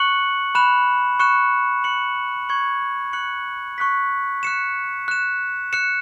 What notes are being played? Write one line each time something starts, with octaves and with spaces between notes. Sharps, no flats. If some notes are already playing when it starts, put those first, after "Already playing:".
Already playing: C#6 F#6 C#7 F#7
B5 F#6 E7
C#6 F#6 C#7 E7
F#6 C#7 F#7
C#6 G#6 C#7 F#7
F#6 C#7 F#7
C#6 F#6 B6
F#6 C#7 E7
F#6 E7
F#6 C#7 E7